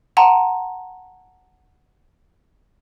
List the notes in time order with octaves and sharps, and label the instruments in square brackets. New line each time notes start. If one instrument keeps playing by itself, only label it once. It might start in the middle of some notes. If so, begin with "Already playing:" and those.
[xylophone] F#5 A5 A#5 C6